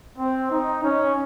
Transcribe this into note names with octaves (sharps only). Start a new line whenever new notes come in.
C4
D#4
C#4